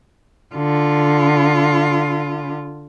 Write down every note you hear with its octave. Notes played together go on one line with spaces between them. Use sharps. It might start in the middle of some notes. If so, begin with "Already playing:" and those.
D3 F4